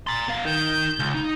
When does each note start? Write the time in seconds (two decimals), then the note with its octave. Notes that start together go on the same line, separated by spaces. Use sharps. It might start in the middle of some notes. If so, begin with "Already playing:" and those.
0.07 A#5 C6 A6
0.28 B3 F5
0.45 D#4 A#4 G6
0.99 C#2
1.15 D#4